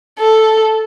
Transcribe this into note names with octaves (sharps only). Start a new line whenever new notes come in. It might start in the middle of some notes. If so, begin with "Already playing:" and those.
A4